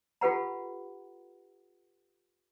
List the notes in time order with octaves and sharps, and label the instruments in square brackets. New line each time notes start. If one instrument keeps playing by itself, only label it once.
[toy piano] F4 G4 A4 B4 F#5 A#5